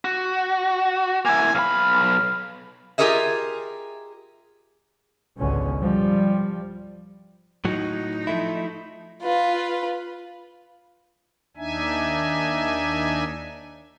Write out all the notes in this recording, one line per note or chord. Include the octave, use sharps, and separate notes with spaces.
F#4
A#3 E4 G#5
B1 F5 B5
F4 G4 G#4 A#4 D#5 E5
G#1 C#2 B2 D3 C#4
F3 G3
A2 F#3 D#4
F3 A3 E4
F4 B4
D#2 D4 D#4 E5 G#5